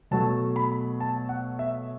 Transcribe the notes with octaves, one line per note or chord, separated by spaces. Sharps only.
B2 F#3 A3 A5
B5
A5
F#5
E5